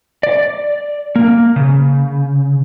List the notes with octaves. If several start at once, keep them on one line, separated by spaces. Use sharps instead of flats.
D5
A#3
C#3